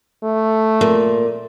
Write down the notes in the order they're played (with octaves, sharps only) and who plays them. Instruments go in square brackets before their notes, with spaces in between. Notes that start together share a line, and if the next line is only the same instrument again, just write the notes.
[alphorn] A3
[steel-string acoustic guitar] A#2